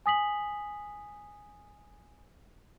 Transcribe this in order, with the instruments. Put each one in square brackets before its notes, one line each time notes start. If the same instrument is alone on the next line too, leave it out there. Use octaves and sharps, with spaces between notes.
[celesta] G#5 D#6 B6 F#7